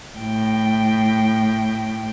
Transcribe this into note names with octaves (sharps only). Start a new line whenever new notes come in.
A2 G5